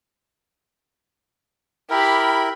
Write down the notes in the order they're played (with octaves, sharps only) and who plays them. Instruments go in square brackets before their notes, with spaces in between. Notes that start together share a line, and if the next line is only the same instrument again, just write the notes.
[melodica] E4 A#4 [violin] G4 B5